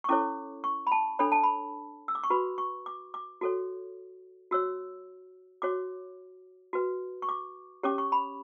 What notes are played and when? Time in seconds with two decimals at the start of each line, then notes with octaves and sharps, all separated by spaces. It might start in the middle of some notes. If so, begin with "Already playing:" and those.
0.04 C#6
0.09 C#4 E4 A4 C#5 D6
0.64 C#6
0.87 B5
0.92 A5
1.19 D4 A4 C#5 B5
1.32 A5
1.43 B5
2.08 E6
2.15 D6
2.23 C#6
2.30 F#4 B4 B5
2.58 C#6
2.86 D6
3.14 D6
3.41 F#4 A4 C#5
4.51 F#4 C#5 E6
5.62 F#4 C#5 D6
6.73 F#4 B4
7.22 C#6
7.29 D6
7.83 C#4 G4 C#5 D6
7.98 C#6
8.12 B5